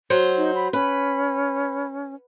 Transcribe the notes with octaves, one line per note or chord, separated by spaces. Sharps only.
F#3 C5
D#4
B5
C#4 B4